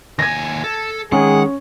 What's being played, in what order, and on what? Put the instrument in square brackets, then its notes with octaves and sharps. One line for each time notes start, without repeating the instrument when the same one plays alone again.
[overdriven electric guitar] D#2 G#5 [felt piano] G#6 A#6
[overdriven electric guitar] A4
[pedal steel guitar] D#3 G#3 [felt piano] C#4 [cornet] G#4 [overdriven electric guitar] F#5